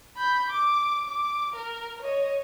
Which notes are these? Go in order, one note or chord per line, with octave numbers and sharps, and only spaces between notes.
B5 G6
D6
D6
A#4
C#5 D#5